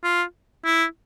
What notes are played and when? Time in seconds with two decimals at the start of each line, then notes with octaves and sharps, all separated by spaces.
0.04 F4
0.65 E4